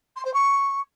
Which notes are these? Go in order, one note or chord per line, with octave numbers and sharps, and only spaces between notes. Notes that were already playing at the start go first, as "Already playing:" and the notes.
C6
C5
C#6